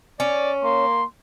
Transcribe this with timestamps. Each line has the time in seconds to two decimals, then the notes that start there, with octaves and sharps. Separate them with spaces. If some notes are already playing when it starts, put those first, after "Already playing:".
0.20 C#4 D5
0.64 A#3 C6